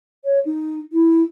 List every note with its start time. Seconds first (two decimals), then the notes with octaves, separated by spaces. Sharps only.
0.25 C#5
0.45 D#4
0.93 E4